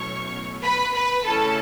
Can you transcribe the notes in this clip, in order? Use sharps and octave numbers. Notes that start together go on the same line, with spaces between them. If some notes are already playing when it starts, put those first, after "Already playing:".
Already playing: B2 F#3 A3 C#4 E4 C#5 C#6
B4 B5
B4 B5
C#3 E3 A3 C#4 E4 A4 A5